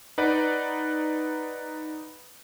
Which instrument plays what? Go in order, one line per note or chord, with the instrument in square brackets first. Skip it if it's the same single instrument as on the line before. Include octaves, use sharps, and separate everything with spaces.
[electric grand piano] D#4 B4 D5 F#5